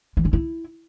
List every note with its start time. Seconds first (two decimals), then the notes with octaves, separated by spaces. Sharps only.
0.17 E3
0.25 C#4
0.33 E4